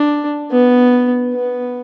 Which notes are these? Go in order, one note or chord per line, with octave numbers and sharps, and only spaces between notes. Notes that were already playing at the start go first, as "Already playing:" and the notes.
Already playing: D4
B3
B3